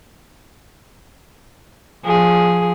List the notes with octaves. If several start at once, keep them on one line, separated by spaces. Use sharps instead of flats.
F3 G#4